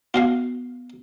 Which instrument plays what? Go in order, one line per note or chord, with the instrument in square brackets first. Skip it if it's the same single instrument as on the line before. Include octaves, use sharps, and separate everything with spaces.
[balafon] B3 [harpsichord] F4 F#4 F5